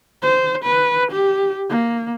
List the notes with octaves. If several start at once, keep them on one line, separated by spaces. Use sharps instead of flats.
C5
B4
G4
A#3